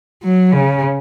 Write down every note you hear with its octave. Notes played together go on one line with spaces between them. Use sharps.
F#3
C#3